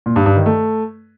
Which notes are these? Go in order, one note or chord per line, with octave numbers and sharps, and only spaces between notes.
A#2
G2
G2
D#3
A3